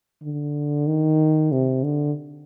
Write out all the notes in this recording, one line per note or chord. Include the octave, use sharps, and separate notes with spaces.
D3
D#3
C3
D3